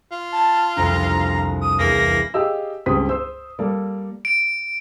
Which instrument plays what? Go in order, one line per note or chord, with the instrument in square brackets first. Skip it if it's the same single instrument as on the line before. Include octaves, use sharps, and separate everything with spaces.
[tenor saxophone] F4
[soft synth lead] A5
[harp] C2 F2 D4 [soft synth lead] A#5
[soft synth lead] D#6
[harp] E2 [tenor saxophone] A#3 [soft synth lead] A#6
[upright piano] G4 G#4 D#5 F5 E6
C#2 G2 C4 G4 D#6 B6
C5 E6
G3 A#3 A4 D5
[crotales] D7